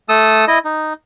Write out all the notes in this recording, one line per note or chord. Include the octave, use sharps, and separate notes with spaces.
A3 A4 D#6 E6
E4 D#5
D#4